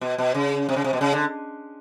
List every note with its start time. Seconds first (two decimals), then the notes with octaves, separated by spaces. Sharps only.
0.01 B2
0.18 B2
0.35 C#3
0.69 C3
0.76 C#3
0.84 C3
0.93 B2
1.01 C#3
1.13 D3